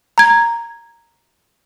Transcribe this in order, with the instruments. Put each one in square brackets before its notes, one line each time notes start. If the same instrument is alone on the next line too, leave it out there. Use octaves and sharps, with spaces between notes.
[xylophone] A#5 G#6